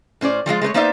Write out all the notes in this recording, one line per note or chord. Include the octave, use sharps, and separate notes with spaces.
A2 C#4 C5 D5
F3 G3 G#3 F4
G#3 A3 B4 C#5
A#3 B3 D#4 C5 D5 E5